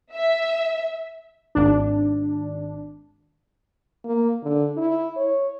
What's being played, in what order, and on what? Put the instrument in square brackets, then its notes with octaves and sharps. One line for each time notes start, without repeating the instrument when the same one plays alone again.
[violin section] E5
[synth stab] G#1 D4
[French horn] A#3
D3
E4
C#5